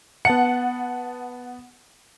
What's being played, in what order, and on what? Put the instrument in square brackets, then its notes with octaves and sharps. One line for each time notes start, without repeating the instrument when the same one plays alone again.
[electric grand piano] B3 A5 C#7 [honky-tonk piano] F#5